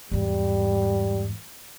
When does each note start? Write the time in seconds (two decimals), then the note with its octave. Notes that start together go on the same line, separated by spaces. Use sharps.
0.11 E2 G#2 G3